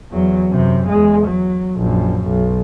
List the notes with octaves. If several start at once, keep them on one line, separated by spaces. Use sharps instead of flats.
E2 F#3
F#2 C3
E2 G#3
F#3
A#1 F#2
B1